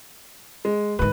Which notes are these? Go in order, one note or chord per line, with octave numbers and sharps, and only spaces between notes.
G#3
G#2 D#3 B4